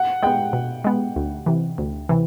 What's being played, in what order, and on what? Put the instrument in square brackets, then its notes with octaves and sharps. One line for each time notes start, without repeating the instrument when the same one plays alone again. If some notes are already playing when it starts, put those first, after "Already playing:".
Already playing: [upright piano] F#5
[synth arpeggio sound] G#3 B3 [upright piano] G5
[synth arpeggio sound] B2
G#3 B3
D2
C3 E3
D2
C3 E3